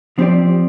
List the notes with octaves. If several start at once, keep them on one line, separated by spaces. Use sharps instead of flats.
F3 C4 G4 D5